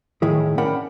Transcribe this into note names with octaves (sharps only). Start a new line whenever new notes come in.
A2 D#3 E4 G#4
C#4 D4 A#4 F#5 G5 B5